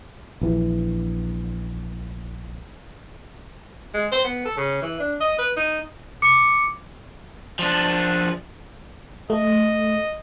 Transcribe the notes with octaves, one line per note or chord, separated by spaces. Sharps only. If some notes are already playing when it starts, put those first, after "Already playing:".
A#1 E3
G#3
C5
B3
A4
C#3
E3
D4
D#5
B4
D#4
D6 C#7
F3 D4
A3 D#5